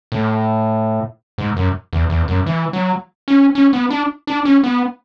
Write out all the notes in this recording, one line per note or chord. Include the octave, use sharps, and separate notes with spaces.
A2
G#2
F#2
E2
E2
F#2
E3
F#3
C#4
C#4
B3
D4
D4
C#4
B3